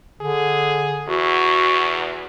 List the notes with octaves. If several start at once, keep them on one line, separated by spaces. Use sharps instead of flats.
D3 G#4
E2 F#4